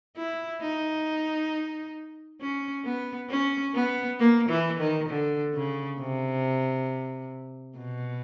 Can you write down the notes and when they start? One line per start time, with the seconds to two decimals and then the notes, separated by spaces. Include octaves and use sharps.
0.16 E4
0.62 D#4
2.41 C#4
2.85 B3
3.30 C#4
3.74 B3
4.19 A#3
4.50 E3
4.80 D#3
5.09 D3
5.55 C#3
5.99 C3
7.78 B2